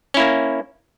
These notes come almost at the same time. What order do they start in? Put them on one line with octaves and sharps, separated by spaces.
C#4 E4 A#3